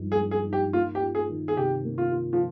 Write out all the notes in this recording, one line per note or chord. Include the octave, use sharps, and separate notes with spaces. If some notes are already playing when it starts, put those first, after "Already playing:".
Already playing: G2 F3 G#3 D#4
G#4
G#3
G#4
D#4
G4
A#3 F4
G4
F4
G#4
D#3
G#4
C3 G4
A#3
F4
F4
F3